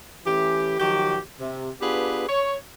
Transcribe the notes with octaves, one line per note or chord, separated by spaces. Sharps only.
E3 A3 C#4 G4
D#3 F3 F#3 F#4 G4
C3
B3 D4 F4 G4 G#4 B4
C#5